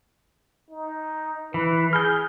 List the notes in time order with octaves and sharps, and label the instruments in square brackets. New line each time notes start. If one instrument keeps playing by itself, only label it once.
[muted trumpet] D#4
[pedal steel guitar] E3 [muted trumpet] B4
[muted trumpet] G#4 [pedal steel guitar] F6 G6